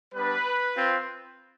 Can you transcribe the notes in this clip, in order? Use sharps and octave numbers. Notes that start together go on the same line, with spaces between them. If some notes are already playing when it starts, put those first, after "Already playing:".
G3 B3 D4 B4
C4 F4